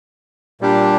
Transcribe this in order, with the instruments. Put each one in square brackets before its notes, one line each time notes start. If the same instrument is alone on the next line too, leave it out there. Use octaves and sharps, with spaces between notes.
[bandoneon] A#2 G3 D4 G4